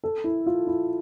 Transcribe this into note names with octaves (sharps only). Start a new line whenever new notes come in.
A4
E4
F4
E4